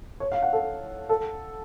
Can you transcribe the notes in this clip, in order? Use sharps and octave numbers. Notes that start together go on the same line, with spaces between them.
C#5
F5
F#5
A4
A4